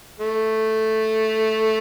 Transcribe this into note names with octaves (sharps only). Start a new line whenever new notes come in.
A3